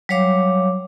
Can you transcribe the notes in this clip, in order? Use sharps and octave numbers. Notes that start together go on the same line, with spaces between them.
F#3 G3 C#5 F5 D6